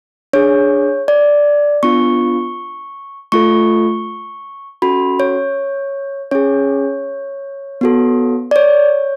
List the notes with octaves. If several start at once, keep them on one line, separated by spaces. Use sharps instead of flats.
D4 G#4 C#5
D5
B3 D4 F4 C#6
A3 F4 A4 C#6
C#4 F#4 A4 B5
C#5
C#4 G#4 C#5
B3 F#4 A4
D5
C#5